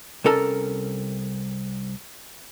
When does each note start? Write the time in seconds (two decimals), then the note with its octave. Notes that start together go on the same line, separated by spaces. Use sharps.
0.24 C2 C#4 A4 A#4 A5